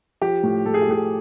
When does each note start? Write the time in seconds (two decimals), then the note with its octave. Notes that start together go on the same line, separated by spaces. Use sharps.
0.22 F3 G4
0.43 A2
0.65 A2 A4
0.74 G#4
0.82 G4
0.88 A2 G#4